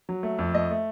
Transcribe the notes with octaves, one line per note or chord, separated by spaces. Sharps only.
F#3
A3
F2
A3 D#5
A3